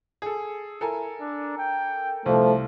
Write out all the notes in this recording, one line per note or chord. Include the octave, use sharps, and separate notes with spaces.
G#4 A4
E4 A4 A#4 G#5
D4
G5
C2 F3 A3 F4